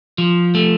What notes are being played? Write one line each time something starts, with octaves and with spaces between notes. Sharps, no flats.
F3
A3